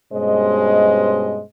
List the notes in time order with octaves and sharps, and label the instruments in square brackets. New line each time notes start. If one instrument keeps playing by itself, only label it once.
[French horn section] G2 B2 G#3 C#4 C5 D#5